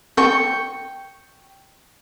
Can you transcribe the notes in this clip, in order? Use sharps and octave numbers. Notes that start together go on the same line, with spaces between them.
G5 C#6